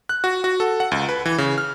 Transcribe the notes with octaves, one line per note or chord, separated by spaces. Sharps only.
F#6
F#4
F#4
A4
F#5
C#2
B4
E3
C#3
F6